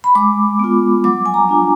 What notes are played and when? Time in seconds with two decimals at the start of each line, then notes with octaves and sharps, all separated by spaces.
0.04 B5
0.15 G#3 D6
0.59 B3 F4
1.04 F#3 D6
1.26 G#5
1.34 A#5
1.49 D4 F4